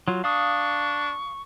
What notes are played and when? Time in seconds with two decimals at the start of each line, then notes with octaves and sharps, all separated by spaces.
0.08 F#3 F4
0.24 D4 F5 C#6 D#6